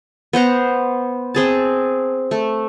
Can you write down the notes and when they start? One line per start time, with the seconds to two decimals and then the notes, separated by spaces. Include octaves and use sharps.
0.33 B3 C5 F#5 A#5
1.34 C4 G#4 A5
2.31 A3